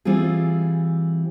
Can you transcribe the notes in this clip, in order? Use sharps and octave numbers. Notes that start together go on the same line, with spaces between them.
E3 G3 C4 F4 G#4